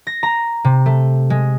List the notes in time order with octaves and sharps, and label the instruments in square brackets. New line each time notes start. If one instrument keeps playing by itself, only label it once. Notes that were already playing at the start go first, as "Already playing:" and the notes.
[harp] A#6
A#5
C3
A3
G#3